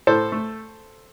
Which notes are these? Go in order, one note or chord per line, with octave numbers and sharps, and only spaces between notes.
A2 A4 C5
A3